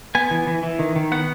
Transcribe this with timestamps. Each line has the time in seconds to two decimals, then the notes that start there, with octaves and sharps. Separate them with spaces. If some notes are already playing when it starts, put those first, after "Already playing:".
0.15 B3 G#5
0.31 E3
0.47 E3
0.63 E3
0.79 D#3
0.96 D#3
1.12 B3 F#5